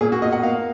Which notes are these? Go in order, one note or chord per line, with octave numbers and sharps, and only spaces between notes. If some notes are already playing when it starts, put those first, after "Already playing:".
A#2 G#4
F#4
A#2 D#5
F#5
A#3 F5